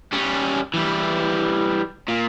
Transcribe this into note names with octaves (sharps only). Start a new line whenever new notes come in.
G3 C#4
E3 G3
A#2